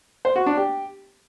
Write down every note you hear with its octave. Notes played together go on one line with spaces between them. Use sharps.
C5
F#4
D4
G4